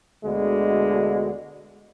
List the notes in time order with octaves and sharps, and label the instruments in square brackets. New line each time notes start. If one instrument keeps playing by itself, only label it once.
[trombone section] D2 B2 D3 G#3